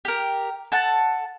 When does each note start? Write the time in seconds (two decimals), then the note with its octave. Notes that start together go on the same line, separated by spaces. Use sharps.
0.05 G4 A#4
0.72 A4 F#5 A5